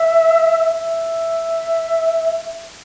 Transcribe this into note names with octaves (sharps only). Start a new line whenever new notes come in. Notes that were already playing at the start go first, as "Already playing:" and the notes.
Already playing: E5
E5